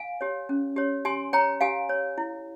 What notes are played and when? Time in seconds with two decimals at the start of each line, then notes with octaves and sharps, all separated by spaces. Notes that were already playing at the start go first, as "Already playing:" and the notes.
Already playing: F5 G#5
0.21 G4 C#5
0.49 C#4
0.76 G4 C#5
1.05 G4 G#5 C6
1.33 C#5 G5 A#5
1.61 G4 F5 G#5
1.89 C#5
2.18 E4